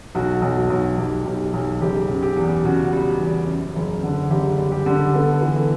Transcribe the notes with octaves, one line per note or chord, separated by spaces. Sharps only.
B1 F#4
B1
F#4
B1
B1 G4
B1 G4
B1
F#1 G4
C#3
G4
E2
C#3 F#4
G3
E2
F#2
F#1
D3
F#1 G4
G3
G4
D3
B3 A4
E3
A4